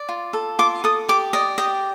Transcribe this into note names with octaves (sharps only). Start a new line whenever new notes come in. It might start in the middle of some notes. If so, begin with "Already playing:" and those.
Already playing: D5
F4
A4
F4 D6
A4 D#6
G4 D6
D5 D#5
G4 D#5